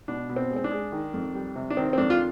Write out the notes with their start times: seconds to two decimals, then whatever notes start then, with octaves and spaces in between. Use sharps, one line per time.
0.08 B2 D4
0.29 B2
0.36 C4
0.51 G#3
0.56 C4
0.64 D4
0.71 G#3
0.92 D#3
1.14 F2
1.35 G3
1.56 C3
1.70 D4
1.77 D#3 C4
1.93 C4
1.98 F2 D4
2.10 F4